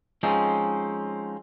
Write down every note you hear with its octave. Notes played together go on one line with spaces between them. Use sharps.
F3 G#3 C4 C#4 D#4